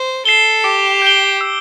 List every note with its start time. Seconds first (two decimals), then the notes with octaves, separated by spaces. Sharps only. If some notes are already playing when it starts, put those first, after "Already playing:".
Already playing: C5
0.25 A4 C7 E7 G7
0.64 G4 D6
1.02 G6 D7 G7
1.41 E6